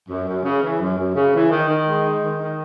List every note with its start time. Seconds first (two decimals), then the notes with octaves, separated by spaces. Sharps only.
0.09 F#2
0.27 F#2
0.44 C#3
0.62 E3
0.80 F#2
0.99 F#2
1.16 C#3
1.34 E3
1.51 D#3
1.69 D#3
1.87 G#3
2.04 D#4
2.23 D#3
2.41 D#3